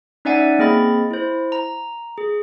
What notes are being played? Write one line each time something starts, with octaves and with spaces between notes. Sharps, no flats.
C#4 D#4 D5 E5 F#5 G#5
A#3 C4 G#4 D#5 B5 A6
E4 C5
A#5
G#4